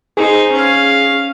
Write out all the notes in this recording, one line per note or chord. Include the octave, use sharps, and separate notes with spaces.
D#4 G#4 C5
C#4 F5